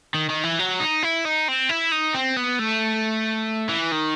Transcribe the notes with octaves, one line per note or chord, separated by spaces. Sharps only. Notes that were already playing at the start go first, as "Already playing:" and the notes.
D#3
D#3
E3
F#3
D#4
E4
D#4
C4
E4
D#4
C4
B3
A3
E3
D#3